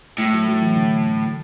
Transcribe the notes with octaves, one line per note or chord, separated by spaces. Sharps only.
A2 G#3
F#3
F#3
E3
D3
D3